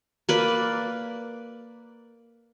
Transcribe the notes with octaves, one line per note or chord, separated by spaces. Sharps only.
A#3 B4 D5